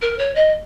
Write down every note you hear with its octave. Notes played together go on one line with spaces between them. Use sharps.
A#4
C#5
D#5